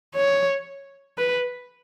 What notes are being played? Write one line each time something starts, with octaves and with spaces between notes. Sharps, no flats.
C#5
B4